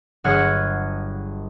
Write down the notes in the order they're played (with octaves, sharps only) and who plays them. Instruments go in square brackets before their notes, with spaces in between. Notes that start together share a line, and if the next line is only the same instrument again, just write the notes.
[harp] G1 F#3 G#4 F#5 F6 G#6